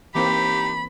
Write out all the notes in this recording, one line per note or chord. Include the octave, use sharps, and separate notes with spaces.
E3 A#3 C4 D#4 G4 B5